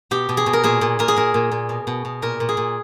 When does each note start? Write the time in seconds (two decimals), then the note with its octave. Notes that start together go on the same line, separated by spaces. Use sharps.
0.11 B2 G4
0.29 B2
0.37 G#4
0.46 B2
0.53 A#4
0.64 A#2 G#4
0.81 A#2
0.99 A#2 A#4
1.08 G#4
1.16 A#2 A#4
1.34 A#2
1.52 A#2
1.69 B2
1.87 B2
2.05 B2
2.22 A#2 A#4
2.40 A#2
2.49 G#4
2.57 A#2